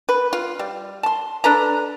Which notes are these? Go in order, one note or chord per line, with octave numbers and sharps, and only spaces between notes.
B4
F4
G3
A5 C6
D4 A4 B4 A#5